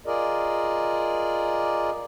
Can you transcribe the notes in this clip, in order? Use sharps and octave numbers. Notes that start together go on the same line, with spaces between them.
F4 G#4 A#4 D5 D#5